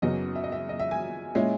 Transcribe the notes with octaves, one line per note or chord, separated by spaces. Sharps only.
F#1 F#2 C#3 F#3 B3 D#5
E5
D#5
E5
D#5
E5
G#5
A#2 G#3 C#4 E4